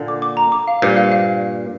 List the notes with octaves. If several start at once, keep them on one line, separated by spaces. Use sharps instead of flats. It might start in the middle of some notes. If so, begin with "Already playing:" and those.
Already playing: A#2 D3
D6
D6
A#5
D6
F5
G2 A#2 C5
F5
F5